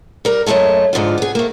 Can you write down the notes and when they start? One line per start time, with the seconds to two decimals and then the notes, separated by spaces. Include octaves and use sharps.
0.25 G3 A#4
0.46 F#2 A#2 G#3 A3 A5
0.93 G#2 D3 F3 F4
1.18 B3 G#4
1.35 A3 A#3